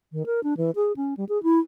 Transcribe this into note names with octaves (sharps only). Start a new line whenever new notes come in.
D#3
A#4
D4
E3
G#4
C#4
G3
G#4
E4